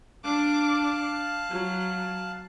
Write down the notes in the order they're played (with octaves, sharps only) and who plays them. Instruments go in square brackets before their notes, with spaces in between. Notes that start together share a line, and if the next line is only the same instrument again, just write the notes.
[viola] D4 D6 [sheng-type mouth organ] F5 A5 F#6
[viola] F#3